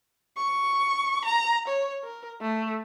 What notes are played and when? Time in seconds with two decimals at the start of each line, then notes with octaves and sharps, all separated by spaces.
0.37 C#6
1.26 A#5
1.68 C#5
2.03 A#4
2.42 A3